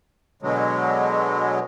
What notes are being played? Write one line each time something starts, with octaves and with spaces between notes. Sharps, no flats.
B2 D3 F#3 G#3